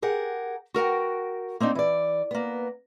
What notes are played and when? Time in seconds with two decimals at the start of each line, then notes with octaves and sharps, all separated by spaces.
0.02 G4 G#4 A#4 F#5
0.74 F#4 A#4 F#5 G5
1.60 A#3 C4 D4 D#4
1.75 E3 D5
2.31 A#3 B3